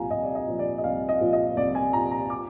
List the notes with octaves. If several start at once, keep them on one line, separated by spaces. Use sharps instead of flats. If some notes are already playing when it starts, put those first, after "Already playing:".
Already playing: C2 A#2 F3 F5 G#5 A#5
C2 D#5
D5
D#5
A#2 F3
D5
D#5
C2 F5
D#5
A#2 F3
D#5
C2 D5
G#5
A#2 F3 A#5
A#5
D6